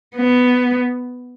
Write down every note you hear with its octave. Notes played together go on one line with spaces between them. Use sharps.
B3